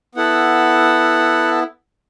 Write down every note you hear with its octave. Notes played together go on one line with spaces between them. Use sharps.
B3 E4 A4 F#5